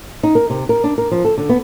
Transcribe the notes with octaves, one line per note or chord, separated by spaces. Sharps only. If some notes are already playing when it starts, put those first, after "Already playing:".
D#4
A#4
C3
A#4
D4
A#4
F3
A4
D3
B3